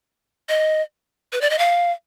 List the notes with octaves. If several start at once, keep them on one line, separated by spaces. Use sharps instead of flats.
D#5
B4
D5
D#5
F5